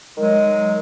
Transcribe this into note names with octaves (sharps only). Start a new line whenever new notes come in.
D#3 F#3 G#3